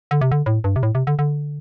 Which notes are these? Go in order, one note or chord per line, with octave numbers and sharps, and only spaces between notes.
D3
C3
D3
A2
G2
C3
A2
C3
D3
D3